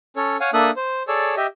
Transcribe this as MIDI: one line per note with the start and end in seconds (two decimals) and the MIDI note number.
0.16 0.37 61
0.16 0.37 69
0.16 0.37 73
0.40 0.50 73
0.40 0.50 77
0.40 0.50 78
0.40 0.50 80
0.53 0.71 58
0.53 0.71 62
0.53 0.71 69
0.53 0.71 76
0.53 0.71 87
0.53 0.71 90
0.77 1.03 72
1.08 1.35 68
1.08 1.35 69
1.08 1.35 73
1.08 1.35 74
1.08 1.35 88
1.37 1.47 67
1.37 1.47 75
1.37 1.47 76